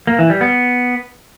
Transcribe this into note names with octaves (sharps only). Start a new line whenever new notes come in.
A#3
E3
G3
B3